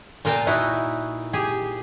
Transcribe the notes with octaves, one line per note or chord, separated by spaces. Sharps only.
A#2 F4 A#4 G5 A5
D#4 E4 F#4
G4 G#4